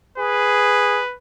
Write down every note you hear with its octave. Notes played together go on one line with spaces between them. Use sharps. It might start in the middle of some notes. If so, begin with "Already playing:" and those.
G#4 B4